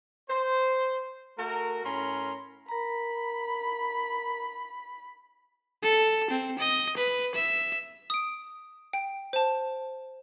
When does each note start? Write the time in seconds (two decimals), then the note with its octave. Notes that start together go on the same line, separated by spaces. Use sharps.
0.30 C5
1.39 A3 F#4 A#4
1.85 A2 C#4 A#4 B5 C6
2.69 A#4 A#5 B5
5.83 A4
6.31 C4
6.59 D#5
6.97 B4
7.35 E5
8.10 D#6 D7
8.93 G5
9.33 C5 A5